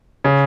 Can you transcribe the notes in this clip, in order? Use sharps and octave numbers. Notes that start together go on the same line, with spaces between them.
C#3